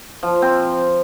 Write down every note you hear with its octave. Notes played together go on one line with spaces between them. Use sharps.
F3
C4